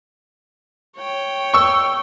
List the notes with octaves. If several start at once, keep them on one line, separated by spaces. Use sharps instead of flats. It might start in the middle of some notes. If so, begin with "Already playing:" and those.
C#5 G5
C#6 E6